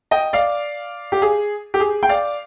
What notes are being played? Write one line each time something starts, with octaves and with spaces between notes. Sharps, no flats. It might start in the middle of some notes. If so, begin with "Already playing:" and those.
D#5 G5
D5 F5
G4
G#4
G4
G#4
G5
D5 F5